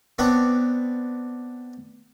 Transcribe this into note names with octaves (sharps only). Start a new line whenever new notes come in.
B3 C4 D4 B4 C#5